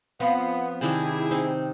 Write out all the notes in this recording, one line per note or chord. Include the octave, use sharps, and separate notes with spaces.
F3 B3 C4 F4
C3 D#3 D4 E4 G#4
C4 D#4